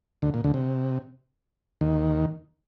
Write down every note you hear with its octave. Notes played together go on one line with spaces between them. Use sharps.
D2 D3
A#2
D2 D3
C3
D#2 D#3